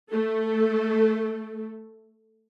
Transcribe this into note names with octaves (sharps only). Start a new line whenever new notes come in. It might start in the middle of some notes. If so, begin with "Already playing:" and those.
A3 A4